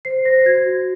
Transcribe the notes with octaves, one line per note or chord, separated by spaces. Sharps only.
C5 C7
C5 A#6
F#4 G#6
F#4